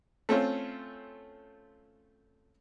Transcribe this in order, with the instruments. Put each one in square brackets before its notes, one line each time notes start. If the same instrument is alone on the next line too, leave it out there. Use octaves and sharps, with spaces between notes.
[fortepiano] A3 C4 C#4 F4